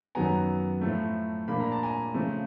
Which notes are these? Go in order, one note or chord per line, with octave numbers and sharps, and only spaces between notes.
F#2 D#3 F#3 B3 G#5 A#5
A2 F3 A3
A#2 F3 A#3 D4 B5
A#5
A5
G#5 A#5
C#3 F3 A3